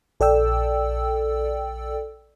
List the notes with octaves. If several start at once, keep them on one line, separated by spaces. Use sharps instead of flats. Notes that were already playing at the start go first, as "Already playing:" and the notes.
A#1 A4 D5 G5 E6